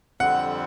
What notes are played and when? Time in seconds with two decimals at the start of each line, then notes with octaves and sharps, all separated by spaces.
0.20 F2 D3 G3 C4 F#5